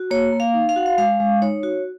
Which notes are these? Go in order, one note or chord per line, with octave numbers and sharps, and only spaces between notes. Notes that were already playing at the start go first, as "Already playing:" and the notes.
Already playing: F#4
A#3 C#5
A#3
F5
D#4
F5
F#4 F#5
F5
G#3 F5
G#3
D#4 C#5
F#4